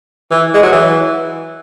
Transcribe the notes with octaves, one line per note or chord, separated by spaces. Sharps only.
E3
G#3
F#3
E3